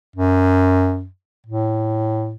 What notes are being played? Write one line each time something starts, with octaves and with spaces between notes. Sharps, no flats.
F#2
A2